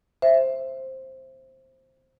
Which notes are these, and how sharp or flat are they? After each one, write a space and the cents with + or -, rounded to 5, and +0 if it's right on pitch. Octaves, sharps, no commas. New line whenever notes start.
C5 +10 E5 +10